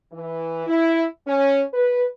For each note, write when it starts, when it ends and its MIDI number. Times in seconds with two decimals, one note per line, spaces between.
0.13 0.67 52
0.67 1.05 64
1.27 1.63 61
1.74 2.05 71